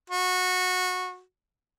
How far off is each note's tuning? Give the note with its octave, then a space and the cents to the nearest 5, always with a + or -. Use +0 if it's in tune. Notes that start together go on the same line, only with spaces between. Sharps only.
F#4 -20